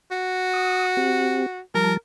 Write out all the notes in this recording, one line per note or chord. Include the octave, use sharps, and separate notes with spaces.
F#4
D#6
C4 G4
F3 G3 A#4 A5